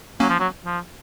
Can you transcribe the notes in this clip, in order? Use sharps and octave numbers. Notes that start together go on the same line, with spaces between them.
F#3 A#3 C#4
F3
F#3
F3